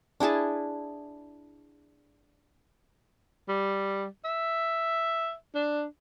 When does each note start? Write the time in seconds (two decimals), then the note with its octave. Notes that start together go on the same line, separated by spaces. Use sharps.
0.20 D4 E4 G#4 A5
3.49 G3
4.25 E5
5.55 D4